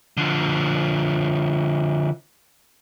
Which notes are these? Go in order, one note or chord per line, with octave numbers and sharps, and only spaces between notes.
D3 F3